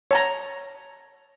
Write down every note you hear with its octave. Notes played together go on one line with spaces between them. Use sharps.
C#5 A5 A#5